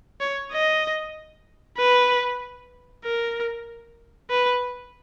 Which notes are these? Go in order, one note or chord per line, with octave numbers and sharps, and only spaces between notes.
C#5
D#5
B4
A#4
B4